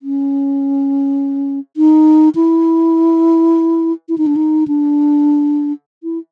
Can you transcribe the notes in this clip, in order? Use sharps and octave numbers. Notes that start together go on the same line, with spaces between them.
C#4
D#4
E4
E4
D#4
D4
D#4
D4
E4